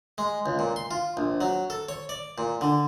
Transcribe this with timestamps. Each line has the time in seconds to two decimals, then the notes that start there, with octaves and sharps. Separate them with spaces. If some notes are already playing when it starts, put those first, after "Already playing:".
0.18 G#3
0.46 C#2
0.59 A#2
0.76 C6
0.91 F4
1.17 A#1
1.41 F#3
1.70 A4
1.89 C#5
2.09 D5
2.38 A#2
2.61 D3